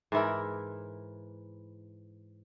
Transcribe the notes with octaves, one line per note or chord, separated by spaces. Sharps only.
G#2 E3 E4 A#4